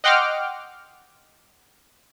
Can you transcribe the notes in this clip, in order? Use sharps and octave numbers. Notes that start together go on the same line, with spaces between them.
D#5 F#5 G5 C6 D6 F6